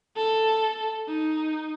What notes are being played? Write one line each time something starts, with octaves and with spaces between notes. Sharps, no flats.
A4
D#4